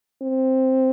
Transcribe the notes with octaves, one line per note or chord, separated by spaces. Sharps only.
C4